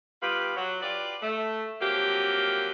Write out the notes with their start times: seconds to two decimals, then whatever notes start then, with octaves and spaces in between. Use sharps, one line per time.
0.21 G3 B3 F4 G4 B4
0.56 F#3
0.81 F4 G4 B4 D5
1.21 A3
1.80 F3 F#3 A#3 C4 G4